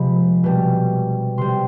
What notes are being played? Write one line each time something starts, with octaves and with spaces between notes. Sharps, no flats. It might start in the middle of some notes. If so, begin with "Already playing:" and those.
Already playing: C3 F3 G#3 B5
B2 G3
C3 G3 C6